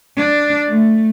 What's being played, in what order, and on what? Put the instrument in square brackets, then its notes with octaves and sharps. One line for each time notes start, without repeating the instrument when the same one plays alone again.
[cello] D4
A3